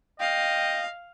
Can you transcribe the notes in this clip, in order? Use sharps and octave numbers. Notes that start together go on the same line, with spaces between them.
D#5 F5 G5